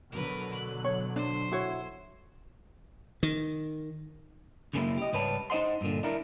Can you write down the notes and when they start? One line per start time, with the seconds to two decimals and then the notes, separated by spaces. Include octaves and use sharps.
0.12 B2 D3 F#3 A#4 B4
0.54 F#6
0.84 C#5
1.16 D4 C5
1.52 E4 F#4 C#5
3.23 D#3
4.73 C#2 F#2 C#3 G#3 A#3 E4
4.97 G4 D#5
5.13 C#2 G#2 G3 B4 C#5 A5
5.50 D#4 C5 D#5 F#5 C6
5.81 G2 A#2 D3
6.03 D4 E4 A#4